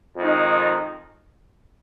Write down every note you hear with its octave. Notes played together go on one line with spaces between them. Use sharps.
F2 D#3 G#3 D#4